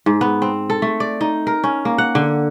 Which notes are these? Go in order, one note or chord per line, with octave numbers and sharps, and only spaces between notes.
G#2
B3
C4
A4
A3
D5
D#4
A#4
C#4
A#3
F#5
D3